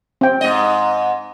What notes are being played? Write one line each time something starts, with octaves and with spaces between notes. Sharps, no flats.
C4 G5
G#2 D#5